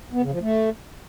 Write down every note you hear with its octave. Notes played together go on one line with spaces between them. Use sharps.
B3
C#3
F3
A3